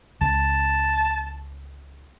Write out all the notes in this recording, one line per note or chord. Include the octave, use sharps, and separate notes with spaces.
C#2 A5